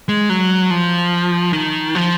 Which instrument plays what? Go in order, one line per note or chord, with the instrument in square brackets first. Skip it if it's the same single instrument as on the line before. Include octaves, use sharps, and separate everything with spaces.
[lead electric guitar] G#3
F#3
F3
D#3
F3